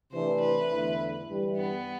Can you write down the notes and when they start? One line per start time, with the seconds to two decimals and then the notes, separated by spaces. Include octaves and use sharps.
0.12 C3 E3 A3 D4 C5
0.40 B4
0.70 E2 D3 A3 E4
1.27 G2 E3 G3
1.55 B3